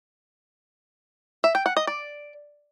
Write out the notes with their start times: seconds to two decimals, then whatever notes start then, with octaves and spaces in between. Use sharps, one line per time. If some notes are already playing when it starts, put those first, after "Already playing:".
1.44 E5
1.55 G5
1.66 F#5
1.77 D#5
1.87 D5